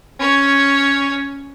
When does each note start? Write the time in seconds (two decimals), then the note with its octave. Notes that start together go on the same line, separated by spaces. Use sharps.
0.20 C#4 C#5